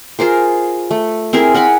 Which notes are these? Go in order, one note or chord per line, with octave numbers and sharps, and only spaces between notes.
F4 G#4 A#4 C5
A3
C4 E4 G#4 A#4
A#4 F#5 G#5 B5